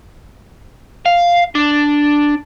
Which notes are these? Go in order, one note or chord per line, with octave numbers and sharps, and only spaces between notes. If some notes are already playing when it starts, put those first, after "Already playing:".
F5
D4